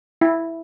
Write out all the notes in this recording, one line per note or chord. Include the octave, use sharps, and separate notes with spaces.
E4